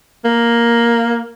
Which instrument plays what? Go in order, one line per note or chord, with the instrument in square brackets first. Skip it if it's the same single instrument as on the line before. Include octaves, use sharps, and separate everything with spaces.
[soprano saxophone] A#3